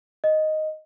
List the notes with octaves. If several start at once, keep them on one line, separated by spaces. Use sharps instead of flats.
D#5